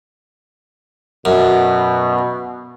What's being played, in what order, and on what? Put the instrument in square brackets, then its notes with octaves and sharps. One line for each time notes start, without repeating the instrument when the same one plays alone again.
[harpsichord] F#2 [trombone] B2